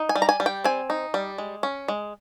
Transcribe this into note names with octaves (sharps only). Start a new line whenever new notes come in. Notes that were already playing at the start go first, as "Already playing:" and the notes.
Already playing: D#4
G#5
G3
A#5
G#5
G3
G5
C4 G#5
D#4
G3
G#3
C#4
G#3